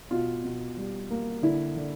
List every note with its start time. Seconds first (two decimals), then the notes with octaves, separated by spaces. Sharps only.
0.11 B2 F4
0.44 B2
0.77 G3
1.10 A#3
1.42 D3 E4
1.76 D3